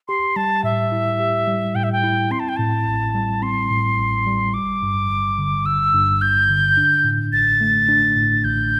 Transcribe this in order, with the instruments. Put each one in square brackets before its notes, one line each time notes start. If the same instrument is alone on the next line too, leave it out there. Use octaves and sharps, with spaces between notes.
[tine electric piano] G4 [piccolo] C6
[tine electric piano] G3 [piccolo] A5
[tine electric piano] A2 [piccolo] E5
[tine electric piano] E4
G4
G3
[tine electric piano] A2 [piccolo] G5
[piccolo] E5
G5
[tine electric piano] E4
[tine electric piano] C4 [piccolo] C6
[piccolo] A5
G5
[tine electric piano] A2 [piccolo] A5
[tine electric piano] A1
G3
[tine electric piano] C4 [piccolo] C6
[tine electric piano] A2
A1
G3
[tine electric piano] G1 [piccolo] D6
[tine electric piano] G2
G1
D3
[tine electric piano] G1 [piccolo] E6
[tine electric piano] G2
[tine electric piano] G1 [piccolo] G6
[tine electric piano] D3
D4
A2
[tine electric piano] A1 [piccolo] A6
[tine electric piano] A3
D4
A2
[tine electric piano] A1 [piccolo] G6